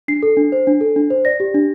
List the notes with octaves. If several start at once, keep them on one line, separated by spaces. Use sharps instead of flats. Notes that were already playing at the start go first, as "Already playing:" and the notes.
D4 C7
A4
D4
C5
D4
A4
D4
C5
D5 A#6
G4
D4